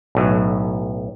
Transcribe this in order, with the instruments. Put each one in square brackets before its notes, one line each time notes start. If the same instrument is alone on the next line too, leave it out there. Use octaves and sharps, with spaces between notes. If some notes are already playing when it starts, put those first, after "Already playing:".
[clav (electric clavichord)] B1 A2 F#3